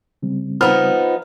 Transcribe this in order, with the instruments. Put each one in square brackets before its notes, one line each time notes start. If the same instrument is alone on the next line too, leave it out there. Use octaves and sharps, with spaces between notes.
[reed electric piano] C#3 G3 C4
[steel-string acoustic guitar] F3 B3 D#4 [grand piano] B5 F6